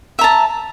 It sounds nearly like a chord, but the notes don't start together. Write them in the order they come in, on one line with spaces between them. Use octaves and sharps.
E5 A#5 A5